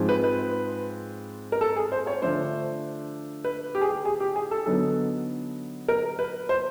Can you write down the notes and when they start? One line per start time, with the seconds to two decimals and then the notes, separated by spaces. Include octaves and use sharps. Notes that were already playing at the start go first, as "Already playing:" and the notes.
Already playing: G#2 F3 G#3 C4
0.09 B4
0.24 B4
1.52 A#4
1.61 A4
1.76 G#4
1.92 C5
2.07 C#5
2.22 D3 F3 A3 D4 C5
3.44 B4
3.75 G4
3.81 G#4
3.89 G4
4.05 G#4
4.20 G4
4.36 G#4
4.51 A4
4.66 D3 F#3 B3 D#4 A4
5.88 A#4
6.19 B4
6.49 C5